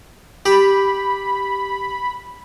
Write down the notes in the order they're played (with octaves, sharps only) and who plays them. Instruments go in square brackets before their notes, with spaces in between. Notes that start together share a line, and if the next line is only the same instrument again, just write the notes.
[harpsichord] G4 [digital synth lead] B5